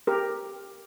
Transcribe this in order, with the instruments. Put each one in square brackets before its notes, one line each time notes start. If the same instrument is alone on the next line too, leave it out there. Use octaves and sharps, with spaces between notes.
[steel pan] G4 A#4